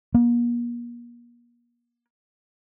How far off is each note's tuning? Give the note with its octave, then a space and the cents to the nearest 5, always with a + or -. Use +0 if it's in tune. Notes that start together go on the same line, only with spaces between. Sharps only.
A#3 +40